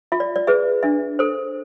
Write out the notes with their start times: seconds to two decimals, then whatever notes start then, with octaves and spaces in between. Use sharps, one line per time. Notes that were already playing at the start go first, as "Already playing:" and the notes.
0.12 F4 E5
0.20 D5
0.36 D5
0.47 G#4 B4 E5
0.83 D4 E5
1.19 A4 C5